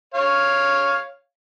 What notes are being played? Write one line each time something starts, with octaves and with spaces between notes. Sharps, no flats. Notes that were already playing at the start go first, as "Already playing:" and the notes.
C#5 F5